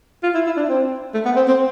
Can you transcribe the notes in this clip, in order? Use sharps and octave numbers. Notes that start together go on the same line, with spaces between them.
F4
E4
E4
D4
C4
A3
B3
C4
C4